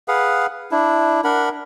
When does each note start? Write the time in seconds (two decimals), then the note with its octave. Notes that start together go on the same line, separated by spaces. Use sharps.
0.08 G#4 B4 F5 F#5
0.71 D4 E4
1.24 D4 A#4 F#5 B5